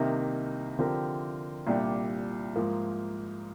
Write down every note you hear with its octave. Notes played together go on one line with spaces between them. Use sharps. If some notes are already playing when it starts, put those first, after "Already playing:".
Already playing: C2 C3 D#3 A#3 D#4
D3 F3 C4 G4 A#4
C2 A#2 G3 D4 G4
G#2 F3 A#3